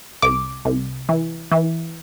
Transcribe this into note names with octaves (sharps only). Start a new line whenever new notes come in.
C2 D6
C2
E3
E3